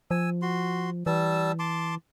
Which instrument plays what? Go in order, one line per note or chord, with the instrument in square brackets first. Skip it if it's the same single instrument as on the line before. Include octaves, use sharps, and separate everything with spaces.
[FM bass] F3 [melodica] G#5 E6
[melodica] F#4 C6
[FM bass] E3 [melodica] G3 A5 E6
[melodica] A5 C6 D6